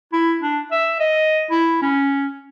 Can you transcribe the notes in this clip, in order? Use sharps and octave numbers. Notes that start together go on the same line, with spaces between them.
E4
D4
E5
D#5
E4
C#4